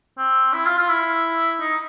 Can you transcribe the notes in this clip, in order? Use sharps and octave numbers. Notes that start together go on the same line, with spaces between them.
C4
E4
F4
F4
E4
D#4